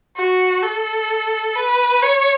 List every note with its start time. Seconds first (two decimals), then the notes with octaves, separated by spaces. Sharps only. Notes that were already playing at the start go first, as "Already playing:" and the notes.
0.17 F#4
0.64 A4
1.56 B4
2.03 C#5